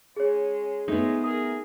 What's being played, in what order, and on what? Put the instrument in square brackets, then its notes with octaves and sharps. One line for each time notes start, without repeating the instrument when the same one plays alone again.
[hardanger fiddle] G#3 C#4 [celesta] G#4 C#5
[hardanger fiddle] G#3 [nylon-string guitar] A3 B3 [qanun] D#4
[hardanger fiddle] G#4 A#4 [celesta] D#6